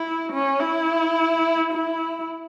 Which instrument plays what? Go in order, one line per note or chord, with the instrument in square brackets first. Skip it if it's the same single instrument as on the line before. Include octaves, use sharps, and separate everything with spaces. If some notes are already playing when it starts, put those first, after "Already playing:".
Already playing: [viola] E4
C#4
E4
E4